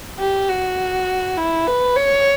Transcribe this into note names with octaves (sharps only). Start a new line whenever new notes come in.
G4
F#4
E4
B4
C#5